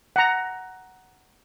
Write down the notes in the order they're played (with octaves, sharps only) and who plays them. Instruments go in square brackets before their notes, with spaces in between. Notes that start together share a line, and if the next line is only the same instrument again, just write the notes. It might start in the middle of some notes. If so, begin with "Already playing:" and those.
[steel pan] F#5 A#5